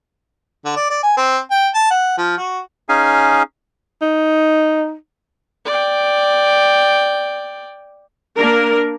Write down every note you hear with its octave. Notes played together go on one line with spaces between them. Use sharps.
D3
D5
D5
G#5
C4
G5
A5
F#5
F3
F#4
C#4 D#4 G#4 F5 G#5
D#4
D5 G5
A#3 D4 A#4